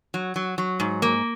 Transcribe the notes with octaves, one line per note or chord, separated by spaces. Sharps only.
F#3
F#3
F#3
G#2
A#3